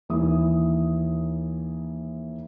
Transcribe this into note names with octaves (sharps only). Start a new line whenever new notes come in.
D#2 E3 E4 D#6